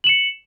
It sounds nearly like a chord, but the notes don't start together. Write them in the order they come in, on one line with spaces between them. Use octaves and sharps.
F#7 E7 C#7